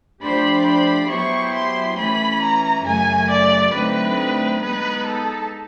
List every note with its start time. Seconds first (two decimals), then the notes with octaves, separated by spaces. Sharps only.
0.23 F3 A3 D4 G4 C5 B5
0.67 B5
1.10 F#3 B3 E4 G4 C5 C#6
1.55 C6
1.98 E3 A3 C#4 B5
2.42 A#5
2.86 F#2 C#3 F#3 A3 G#5
3.30 D5
3.74 D3 F#3 A3 C4 D#4 B4
4.61 G#3 B3 D#4 B4
5.06 A4